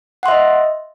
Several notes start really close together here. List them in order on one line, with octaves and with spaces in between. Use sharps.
F#5 C6 E5 D#5